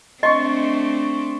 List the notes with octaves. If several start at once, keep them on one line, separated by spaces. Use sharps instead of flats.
A3 C4 D4 D#5 C6 C#6